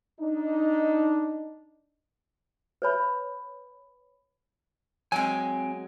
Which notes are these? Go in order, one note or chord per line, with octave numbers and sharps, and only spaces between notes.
D4 D#4
B4 C#5 B5
F#3 G#3 C4 G5 G#5